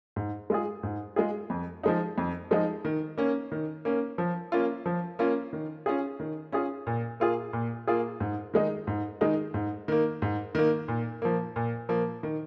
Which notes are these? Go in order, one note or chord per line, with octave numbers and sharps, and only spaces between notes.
G#2
G#3 F4 G#4
G#2
G#3 F4 G#4
F2
F3 G#3 D#4
F2
F3 G#3 D#4
D#3
A#3 C#4
D#3
A#3 C#4
F3
A#3 C#4 F4
F3
A#3 C#4 F4
D#3
C#4 F4 G#4
D#3
C#4 F4 G#4
A#2
A#3 F4 G#4
A#2
A#3 F4 G#4
G#2
D#3 G#3 D#4
G#2
D#3 G#3 D#4
G#2
D#3 A#3
G#2
D#3 A#3
A#2
F3 A#3
A#2
F3 A#3
D#3